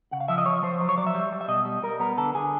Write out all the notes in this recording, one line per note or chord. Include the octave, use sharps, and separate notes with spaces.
C#3 F#5
F5
F3 E5
D#5
F3 C#5
F3 C5
F#3 C5
C#5
F#3 D5
E5
G3
G3
E5
B2 D#5
G3
G3 A#4
B3 A#4
D3 A4
D3 G#4